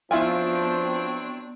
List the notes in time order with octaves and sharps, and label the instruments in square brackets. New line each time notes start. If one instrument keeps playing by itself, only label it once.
[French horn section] F3 [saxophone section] F#3 C4 D4 [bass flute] B3 [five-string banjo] E4 F4 G#5